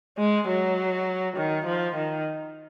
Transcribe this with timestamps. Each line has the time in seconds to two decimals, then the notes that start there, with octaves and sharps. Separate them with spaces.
0.18 G#3
0.48 F#3
1.37 D#3
1.66 F3
1.95 D#3